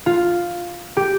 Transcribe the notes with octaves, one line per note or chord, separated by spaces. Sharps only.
F4
G4